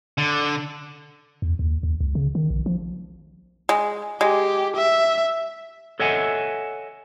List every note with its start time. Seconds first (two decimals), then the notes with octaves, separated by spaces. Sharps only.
0.18 D3
1.42 E2
1.59 D#2
1.83 D#2
2.01 C#2
2.15 C#3
2.35 D#3
2.50 A#1
2.66 F3
3.69 G#3
4.21 G#3 G4
4.76 E5
6.00 A4 C#5 D#5 E5 F#5 G#5